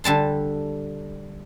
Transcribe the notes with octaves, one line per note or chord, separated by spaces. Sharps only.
D3 G3 A5 C6